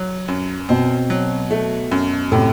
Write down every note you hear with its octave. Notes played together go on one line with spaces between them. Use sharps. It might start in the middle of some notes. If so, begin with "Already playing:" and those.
Already playing: F#3
F#2
B2 C4
F#3
A3
F#2
A2 C3